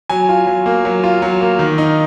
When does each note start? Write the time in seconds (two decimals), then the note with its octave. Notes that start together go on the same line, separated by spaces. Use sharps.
0.09 F#3 G#5
0.29 F4
0.47 F#3
0.66 A#3
0.85 F#3
1.03 F4
1.22 F#3
1.41 A#3
1.59 D#3
1.78 D#4